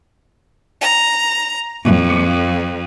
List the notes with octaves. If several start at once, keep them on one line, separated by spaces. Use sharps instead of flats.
A#5
F2